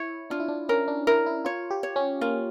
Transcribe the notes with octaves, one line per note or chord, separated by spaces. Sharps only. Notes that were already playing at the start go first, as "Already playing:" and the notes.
Already playing: E4 C#5
D4 F4
E4
D4
C#4 A#4
D4
E4 A#4
E4
F4 C#5
G4
C#5
C#4
A#3 F4